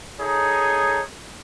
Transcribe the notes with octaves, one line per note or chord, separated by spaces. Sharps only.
D#4 G#4 A4 C#5